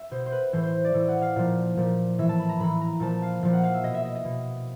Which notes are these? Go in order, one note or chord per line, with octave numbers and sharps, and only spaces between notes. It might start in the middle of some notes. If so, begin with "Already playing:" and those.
Already playing: E5
B2 C5
C5
B4
A2 E3 C5
C5
D5
A2 E3
F#5
F5
A#2 F3
A#2 F3
A2 E3 E5
A5
B5
A#5
A2 E3 B5
A#5
A#2 F3 A5
F5
A#2 F3 F5
F#5
F5
E5
B2 D#5
E5
D#5
D#5
B2